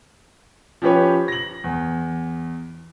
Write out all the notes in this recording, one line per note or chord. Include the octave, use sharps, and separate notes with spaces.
F3 C#4 G4 B4 C#5
A#6 F#7
E2